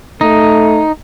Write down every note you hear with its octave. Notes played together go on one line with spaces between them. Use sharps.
A3 D#4